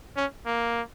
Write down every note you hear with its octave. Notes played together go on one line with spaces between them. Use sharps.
C#4
A#3